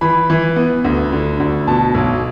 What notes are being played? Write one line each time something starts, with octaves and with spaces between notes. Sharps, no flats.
E3 B5
E3
B3
D2
D3
D2
B2 A5
B1